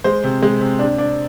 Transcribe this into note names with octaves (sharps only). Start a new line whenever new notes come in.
G#3 C5
C3
G#3
C3
D4
D4